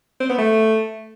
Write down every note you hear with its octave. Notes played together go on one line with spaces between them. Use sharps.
C4
B3
A3